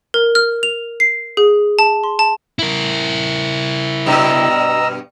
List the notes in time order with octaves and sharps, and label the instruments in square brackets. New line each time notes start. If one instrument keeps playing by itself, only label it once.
[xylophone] A#4
F6
F7
C7
G#4
A5
C6
A5
[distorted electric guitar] E4 A#4
[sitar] G2 B2 [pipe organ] D#5 A#5 E6